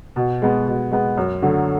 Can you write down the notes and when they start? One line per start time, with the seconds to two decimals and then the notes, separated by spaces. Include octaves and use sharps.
0.16 B2
0.42 G#3 B3
0.67 B2
0.91 G#3 B3
1.17 F#2
1.42 D3 F#3 A3